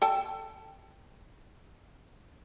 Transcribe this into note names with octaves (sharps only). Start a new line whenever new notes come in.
A4 G5 A5